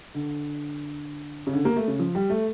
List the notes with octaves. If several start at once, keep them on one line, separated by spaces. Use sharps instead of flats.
D3
C#3
D3
A#3
A3
C#3
F3
G3
A3